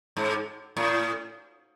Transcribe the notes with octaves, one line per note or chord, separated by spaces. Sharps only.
G#2
A2